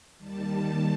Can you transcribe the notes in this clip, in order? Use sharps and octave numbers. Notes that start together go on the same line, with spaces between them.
D#2 D#3 G3 A5